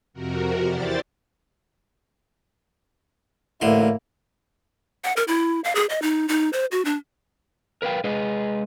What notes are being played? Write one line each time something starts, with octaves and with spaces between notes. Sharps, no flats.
F2 C3 F#4 A#4
E2 E4 G4 C5 D5 A6
A1 D3 A#3 E4 C6
F#5
A#4
E4
F5
G#4
D#5
D#4
D#4
C5
F#4
D4
A#4 B4 F5 G5
G#3 G#4 B4 D#5